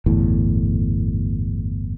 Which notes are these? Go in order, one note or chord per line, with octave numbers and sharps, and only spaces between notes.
G1 E2 A2